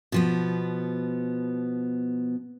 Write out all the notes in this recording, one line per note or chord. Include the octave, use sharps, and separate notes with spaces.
B2 F3 B3